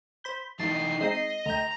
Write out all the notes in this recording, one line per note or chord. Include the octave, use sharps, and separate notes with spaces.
C5 B5 G6
E3 D#4 A5 C7
G#3 C4 D#4 D#5
D2 G5 A#5